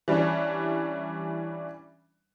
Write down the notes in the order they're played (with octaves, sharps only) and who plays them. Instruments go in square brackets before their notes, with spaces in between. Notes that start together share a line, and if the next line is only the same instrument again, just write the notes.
[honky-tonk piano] E3 G3 C#4 D4